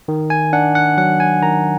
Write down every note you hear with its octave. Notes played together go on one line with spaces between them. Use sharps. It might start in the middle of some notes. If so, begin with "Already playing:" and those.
D#3
G#5
D4 F#5
F#5
F#3 F#5
G#5
D#3 A#5